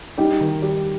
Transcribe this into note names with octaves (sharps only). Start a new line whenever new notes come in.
G3 D#4 G4
D#3
G3